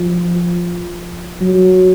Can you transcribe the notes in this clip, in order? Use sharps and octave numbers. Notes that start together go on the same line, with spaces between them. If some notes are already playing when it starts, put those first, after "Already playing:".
Already playing: F3
F#3